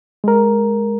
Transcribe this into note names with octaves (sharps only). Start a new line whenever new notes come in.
G#3 A#4